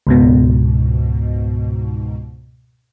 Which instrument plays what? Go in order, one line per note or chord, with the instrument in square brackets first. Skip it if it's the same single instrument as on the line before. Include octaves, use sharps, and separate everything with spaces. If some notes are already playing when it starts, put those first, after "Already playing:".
[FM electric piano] C#2 G#2 B2